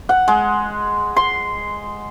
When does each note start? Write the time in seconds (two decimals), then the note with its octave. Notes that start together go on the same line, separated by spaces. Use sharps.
0.09 F#5
0.28 G#3
1.16 C6